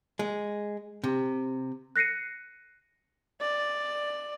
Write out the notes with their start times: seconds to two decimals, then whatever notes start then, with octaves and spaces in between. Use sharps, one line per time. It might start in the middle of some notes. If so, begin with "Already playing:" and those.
0.19 G#3
1.04 C3
1.96 F#6 A#6 C7 C#7 D#7
3.41 D5